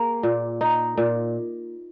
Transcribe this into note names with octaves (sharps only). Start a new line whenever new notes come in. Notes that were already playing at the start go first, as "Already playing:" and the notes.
Already playing: A#3 G#4
A#2
D#4
A#2